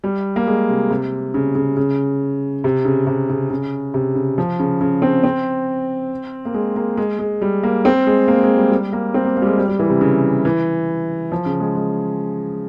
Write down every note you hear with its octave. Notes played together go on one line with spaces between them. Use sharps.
G3
A#3
G#3
C3
C3
C#3
C#3
C#3
C3
C#3
C3
C#3
C#3
C3
C#3
F3
C#3
C#3
C4
C4
A#3
G#3
A#3
G#3
G#3
G3
A#3
C4
G#3
A#3
G#3
G3
G3
A#3
C4
A#3
A#3
G3
G#3
G3
G3
E3
C3
C#3
E3
F3
C#3
G#3
G#3